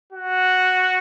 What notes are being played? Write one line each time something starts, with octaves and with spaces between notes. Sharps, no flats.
F#4